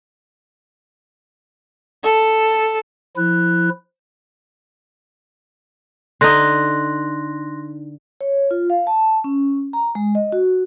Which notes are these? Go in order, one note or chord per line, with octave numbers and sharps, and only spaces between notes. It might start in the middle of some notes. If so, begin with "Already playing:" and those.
A4
F3 E4 F#6
D3 D#4 C6 F#6 A#6
C#5
F4
F5
A5
C#4
A#5
G#3
D#5
F#4